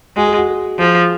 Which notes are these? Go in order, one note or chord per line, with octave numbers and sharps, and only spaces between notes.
G#3 F#4
G#4
F#4
G#4
F3 G#4